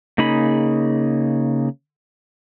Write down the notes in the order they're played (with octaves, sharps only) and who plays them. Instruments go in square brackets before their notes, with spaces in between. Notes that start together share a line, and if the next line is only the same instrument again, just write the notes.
[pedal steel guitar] C#3 A#3 D#4 G#4 B5